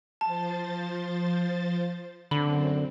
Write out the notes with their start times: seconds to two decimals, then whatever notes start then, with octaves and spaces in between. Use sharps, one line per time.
0.21 F3 C5 A5 A6
2.31 F#2 D3 C4 B5